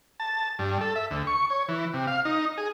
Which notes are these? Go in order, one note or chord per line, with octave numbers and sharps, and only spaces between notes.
A5
G2
A4
E5
D2
C#6
C#5
E3
C3
F5
D#4
G#4